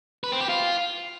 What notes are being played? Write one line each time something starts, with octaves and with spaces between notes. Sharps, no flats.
B4
C4
G4
F4